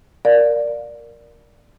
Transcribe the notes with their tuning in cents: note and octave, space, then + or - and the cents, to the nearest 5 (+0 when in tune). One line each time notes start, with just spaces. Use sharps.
A#4 +0 D5 +0 F5 +20